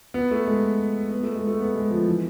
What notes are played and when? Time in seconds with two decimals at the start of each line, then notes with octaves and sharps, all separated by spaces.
0.14 B3
0.31 A3
0.47 G#3
1.11 B3
1.23 A3
1.35 G#3
1.47 A3
1.59 B3
1.76 G#3
1.90 F3
2.07 E3